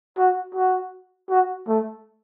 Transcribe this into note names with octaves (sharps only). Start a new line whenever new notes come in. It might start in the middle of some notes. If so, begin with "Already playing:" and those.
F#4
F#4
F#4
A3